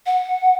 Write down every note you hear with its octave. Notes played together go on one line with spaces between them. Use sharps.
F#5